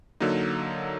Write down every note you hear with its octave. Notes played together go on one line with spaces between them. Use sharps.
D3 F#3 A#3 D#4